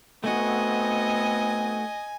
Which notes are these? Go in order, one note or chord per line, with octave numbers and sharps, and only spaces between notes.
A3 B3 C4 D#4 F#4 D#5 G#5